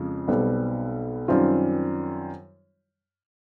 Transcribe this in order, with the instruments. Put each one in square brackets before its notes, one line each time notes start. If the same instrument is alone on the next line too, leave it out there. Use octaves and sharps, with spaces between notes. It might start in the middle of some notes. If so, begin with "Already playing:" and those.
Already playing: [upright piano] F2 C#3 F3 G#3
B1 B2 G3 C4
F#2 D#3 G3 C4 F4